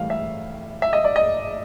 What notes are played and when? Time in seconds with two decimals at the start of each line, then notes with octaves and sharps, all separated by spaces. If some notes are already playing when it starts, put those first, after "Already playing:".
Already playing: A2 E3 G3 F5
0.10 E5
0.82 E5
0.93 D#5
1.04 D5
1.16 D#5